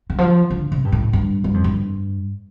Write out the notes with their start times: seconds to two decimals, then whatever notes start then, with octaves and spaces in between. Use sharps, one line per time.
0.10 D3
0.18 F3
0.50 D3
0.72 C3
0.85 G2
0.92 A2
1.13 G2
1.44 G2
1.54 F2
1.64 G2